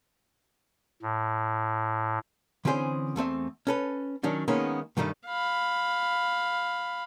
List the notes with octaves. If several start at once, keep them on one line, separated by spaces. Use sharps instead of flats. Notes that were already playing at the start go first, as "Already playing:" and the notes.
A2
D3 E3 C4 C#4 G#4 C5
E2 A3 C4 E5
C#4 A4 B4
D#3 F#3 C#4 D4
D#3 G#3 A#3 B3 C#4 D#4
G2 D#3 G3 A3 D#4
F5 B5